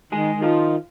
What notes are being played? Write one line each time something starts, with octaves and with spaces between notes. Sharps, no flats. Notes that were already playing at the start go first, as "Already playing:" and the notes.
D#3 G#3 G#4
D#3
F3 F4